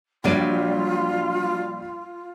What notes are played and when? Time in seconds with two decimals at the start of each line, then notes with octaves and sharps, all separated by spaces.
0.24 A#1 F#3 G3 D4 F4 D5 D#7